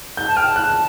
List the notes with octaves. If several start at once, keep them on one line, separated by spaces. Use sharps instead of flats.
G6
A5
G5 F6
A5
F#6